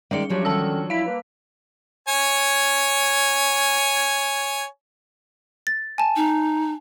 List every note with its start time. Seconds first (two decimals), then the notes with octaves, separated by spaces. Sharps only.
0.11 D#3 G3 G#3 D5 C#7
0.30 F3 F#3 C#4 D4 G4 C#5
0.45 D3 D#3 C#4 A5 E6
0.90 E4 F5 B6
1.06 A#3 B4
2.08 C#5 G#5
5.67 A6
5.98 G#5 A5
6.16 D#4